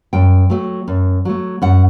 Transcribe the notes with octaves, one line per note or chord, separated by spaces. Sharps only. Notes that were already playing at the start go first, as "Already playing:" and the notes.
F#2 G5
F#3 A3
F#2
F#3 A3
F#2 F#5